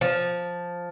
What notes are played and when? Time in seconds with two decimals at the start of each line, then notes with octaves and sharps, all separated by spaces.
0.01 F3